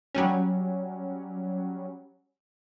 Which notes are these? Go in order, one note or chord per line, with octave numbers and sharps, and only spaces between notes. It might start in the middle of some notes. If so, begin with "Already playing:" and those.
F#3 G3 C#4